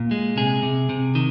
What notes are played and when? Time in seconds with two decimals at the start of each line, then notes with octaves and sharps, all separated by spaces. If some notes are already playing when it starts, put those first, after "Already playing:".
Already playing: A#2
0.11 G#3
0.37 C3 G#4
0.63 C3
0.89 C3
1.15 D#3